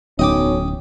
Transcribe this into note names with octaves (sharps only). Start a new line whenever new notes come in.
D1 B1 C#4 D#5 G5 D6